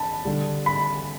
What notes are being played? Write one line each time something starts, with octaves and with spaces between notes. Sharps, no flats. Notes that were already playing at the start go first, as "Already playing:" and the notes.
Already playing: A5 B5
D3 G3
B5